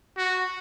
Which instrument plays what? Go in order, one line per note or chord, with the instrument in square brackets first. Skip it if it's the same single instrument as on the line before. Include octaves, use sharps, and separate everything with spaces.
[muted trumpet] F#4